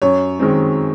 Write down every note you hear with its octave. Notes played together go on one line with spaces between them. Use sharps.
F#2 C#5
D#3 G#3 C4